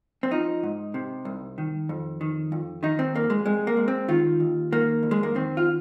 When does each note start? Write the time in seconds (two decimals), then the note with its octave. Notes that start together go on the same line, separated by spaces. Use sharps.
0.23 C4
0.31 F3 D#4
0.63 G#2
0.94 C3
1.25 C2
1.58 D#3
1.89 F2
2.21 D#3
2.52 F2
2.83 D#3 D#4
2.99 C4
3.15 F2 A#3
3.30 G#3
3.46 C3 G#3
3.67 A#3
3.77 G#3
3.88 C4
4.08 D#3 F4
4.40 D#2
4.72 D#3 A#3
5.03 F2
5.11 G#3
5.23 A#3
5.35 D#3 C4
5.57 F4